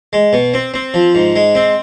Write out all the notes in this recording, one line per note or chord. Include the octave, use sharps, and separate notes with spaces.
G#3
B2
C4
C4
F3
G#2
G#3
C4